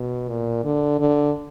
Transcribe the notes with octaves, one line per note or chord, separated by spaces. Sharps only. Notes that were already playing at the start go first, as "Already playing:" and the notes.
Already playing: B2
A#2
D3
D3